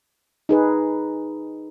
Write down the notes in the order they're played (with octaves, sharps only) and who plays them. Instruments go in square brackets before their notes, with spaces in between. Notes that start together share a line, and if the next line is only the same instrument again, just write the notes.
[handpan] D#4 G#4 B4